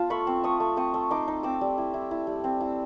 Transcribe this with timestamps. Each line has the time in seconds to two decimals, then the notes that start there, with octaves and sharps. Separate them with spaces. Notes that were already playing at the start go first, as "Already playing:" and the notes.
Already playing: B3 F4 A5
0.10 A3 B5 C#6
0.27 C4
0.44 A3 C#6 D#6
0.60 A3
0.77 C4 C#6 D#6
0.94 A3
1.11 D#4 C6 D6
1.28 D#4
1.43 C4 D6 E6
1.61 G3
1.78 E4
1.94 E4
2.11 E4
2.27 G3
2.44 C4
2.61 E4